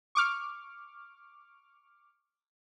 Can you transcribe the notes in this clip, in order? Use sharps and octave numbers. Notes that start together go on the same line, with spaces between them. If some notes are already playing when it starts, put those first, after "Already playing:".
C#6 D6 F6